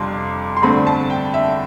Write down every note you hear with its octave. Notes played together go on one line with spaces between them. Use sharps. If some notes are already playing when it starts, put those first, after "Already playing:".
Already playing: F2 C3 G3 D4 F4 C6
C6
G2 D3 A3 C4 B5
A5
G5
E5